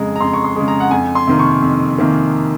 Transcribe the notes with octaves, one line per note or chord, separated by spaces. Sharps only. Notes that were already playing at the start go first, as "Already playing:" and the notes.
Already playing: F2 C#3 G#3 A#5
A#5
F2 C6
C#6
C6
C#3 G#3
A#5
F#5
F2 G#5
C6
C3 D#3 A#3
C#6
F2
C3 D#3 A#3